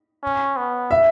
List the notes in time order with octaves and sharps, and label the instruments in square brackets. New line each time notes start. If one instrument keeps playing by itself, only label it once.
[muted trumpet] C#4
B3
[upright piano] E5